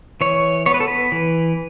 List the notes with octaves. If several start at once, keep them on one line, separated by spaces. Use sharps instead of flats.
E3 C#5
B3 C#5
B4
A4
B4
E3